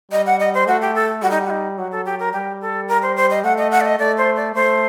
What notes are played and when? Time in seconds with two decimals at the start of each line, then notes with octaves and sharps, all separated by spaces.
0.12 G3 D#5
0.26 F#5
0.40 D#5
0.54 C5
0.67 A3 F#4
0.82 G4
0.95 A4
1.22 G3 F#4
1.31 D#4
1.45 F#4
1.50 D#4
1.78 F#3 F#4
1.92 A4
2.05 G4
2.19 A#4
2.33 G3 G4
2.61 A4
2.88 A#4
3.02 C5
3.16 C5
3.30 D#5
3.44 A3 F#5
3.58 D#5
3.71 F#5
3.81 D5
3.85 D#5
3.99 A3 D5
4.18 C5
4.36 D5
4.55 A3 C5